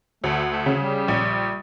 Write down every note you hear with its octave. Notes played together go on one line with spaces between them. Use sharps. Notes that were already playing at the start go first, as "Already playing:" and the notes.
D2 A3
A3
C#3
G3
A#1